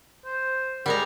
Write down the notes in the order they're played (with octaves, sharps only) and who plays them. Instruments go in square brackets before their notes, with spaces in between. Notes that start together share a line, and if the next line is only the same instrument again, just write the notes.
[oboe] C5
[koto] G3 G#3 A#5 [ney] A#4